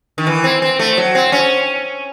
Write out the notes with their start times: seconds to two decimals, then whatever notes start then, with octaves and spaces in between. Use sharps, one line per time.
0.18 D#3
0.27 E3
0.44 C4
0.62 C4
0.79 A3
0.97 F#3
1.15 C4
1.32 C#4